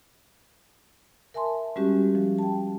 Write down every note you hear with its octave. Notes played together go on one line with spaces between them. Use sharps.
A#4 E5 G#5 A5 C6
G3 G#3 C#4 F#4 G4
F3
G5 A5